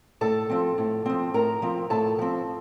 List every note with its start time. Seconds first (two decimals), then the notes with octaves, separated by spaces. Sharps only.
0.21 A2 A4 A5
0.50 F3 C4
0.78 A2
1.06 F3 C4
1.34 A2 A#4 A#5
1.62 F3 C4
1.90 A2 A4 A5
2.19 F3 C4